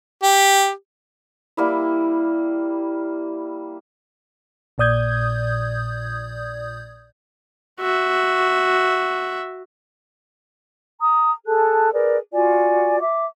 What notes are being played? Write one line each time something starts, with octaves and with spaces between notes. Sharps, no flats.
G4
G3 A#3 E4
A#1 A#2 D5 D#6 G6 G#6
F#4 E5
A#5 D#6
G#4 A4 A5 F#6
G#4 A#4 B4 D5
F4 F#4 D5 G#5
E5 D6